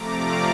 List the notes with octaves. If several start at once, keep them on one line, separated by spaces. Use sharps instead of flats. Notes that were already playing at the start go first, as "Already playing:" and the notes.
Already playing: C3 F3 A3 A#5 D6
D5 F5